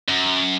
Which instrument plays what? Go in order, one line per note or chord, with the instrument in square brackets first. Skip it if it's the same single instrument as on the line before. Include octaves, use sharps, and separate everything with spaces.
[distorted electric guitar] F#2